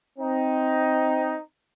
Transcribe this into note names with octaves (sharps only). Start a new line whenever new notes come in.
C4 D#4